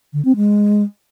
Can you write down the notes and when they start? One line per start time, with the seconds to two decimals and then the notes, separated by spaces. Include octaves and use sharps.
0.13 D3
0.25 C4
0.36 G#3